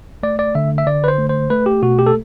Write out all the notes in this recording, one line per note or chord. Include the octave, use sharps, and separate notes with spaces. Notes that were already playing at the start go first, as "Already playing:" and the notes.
A3 D5
D5
D3 E5
E5
D3 D5
B4
C5
A3
C5
A3 B4
G4
B2 F#4
G4
A4